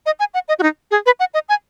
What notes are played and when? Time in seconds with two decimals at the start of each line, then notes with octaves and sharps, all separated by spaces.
0.06 D#5
0.20 G#5
0.34 F#5
0.48 D#5
0.59 F#4
0.63 D#4
0.91 G#4
1.06 B4
1.20 F#5
1.34 D#5
1.49 G#5